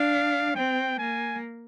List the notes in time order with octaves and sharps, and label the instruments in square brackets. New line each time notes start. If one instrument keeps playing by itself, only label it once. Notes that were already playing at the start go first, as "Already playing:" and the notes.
Already playing: [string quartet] D4 [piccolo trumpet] F5
[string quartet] C4 [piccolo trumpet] G5
[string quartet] A#3 [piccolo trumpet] G#5